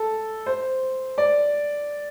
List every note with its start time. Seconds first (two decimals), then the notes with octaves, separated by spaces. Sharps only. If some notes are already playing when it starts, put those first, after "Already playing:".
Already playing: A4
0.46 C5
1.18 D5